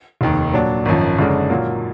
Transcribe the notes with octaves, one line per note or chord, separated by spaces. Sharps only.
F1 D#2 D#3
A#2 F#3 D4
G#1 F#2 F3
F#1 F#2 D3 G#3 D4
A#2 F#3 A#3 F4